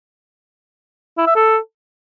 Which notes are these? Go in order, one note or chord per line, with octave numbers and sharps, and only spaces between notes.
E4
E5
A4